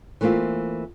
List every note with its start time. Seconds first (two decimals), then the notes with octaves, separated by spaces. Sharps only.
0.21 E3 A3 A#3 C4 F4